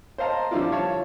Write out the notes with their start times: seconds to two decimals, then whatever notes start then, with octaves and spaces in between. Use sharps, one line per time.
0.18 C5 D#5 F5 A5 A#5
0.51 D3 F3 G3 D4 E4 F4
0.72 C#5 F5 A5